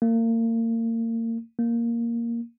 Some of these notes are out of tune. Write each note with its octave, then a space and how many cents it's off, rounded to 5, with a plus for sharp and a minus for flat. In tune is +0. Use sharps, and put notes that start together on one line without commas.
A#3 -35
A#3 +0